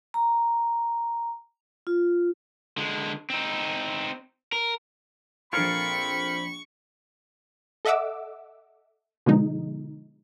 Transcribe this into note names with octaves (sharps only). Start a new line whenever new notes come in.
A#5
F4
D3 G#3
C4 D#4
A#4
A#1 C4 F4 A4 A#4 B5 C#6 G#6
A4 D#5 E5 F#5 D6 E6
B2 D3 F3 G#3 D#4